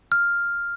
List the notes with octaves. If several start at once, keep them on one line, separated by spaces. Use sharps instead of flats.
F6